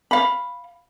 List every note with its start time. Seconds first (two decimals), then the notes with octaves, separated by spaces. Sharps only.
0.11 F5 B5